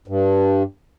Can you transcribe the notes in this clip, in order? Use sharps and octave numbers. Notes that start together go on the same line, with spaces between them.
G2